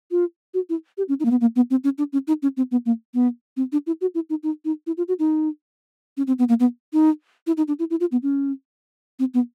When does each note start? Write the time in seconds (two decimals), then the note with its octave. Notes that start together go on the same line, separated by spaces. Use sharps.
0.11 F4
0.54 F#4
0.69 E4
0.98 G4
1.09 C#4
1.20 D#4
1.25 A#3
1.31 B3
1.41 A#3
1.56 B3
1.70 C4
1.84 C#4
1.98 D4
2.13 C#4
2.27 D#4
2.42 C#4
2.57 C4
2.71 B3
2.86 A#3
3.14 B3
3.57 C4
3.72 D4
3.87 E4
4.01 F#4
4.15 E4
4.30 D#4
4.43 D#4
4.65 D#4
4.87 E4
4.97 F4
5.08 F#4
5.19 D#4
6.17 C#4
6.27 C4
6.39 B3
6.49 A#3
6.60 B3
6.93 D#4
7.47 E4
7.57 D#4
7.68 D4
7.79 E4
7.90 E4
8.00 F4
8.12 B3
8.23 C#4
9.19 C4
9.34 B3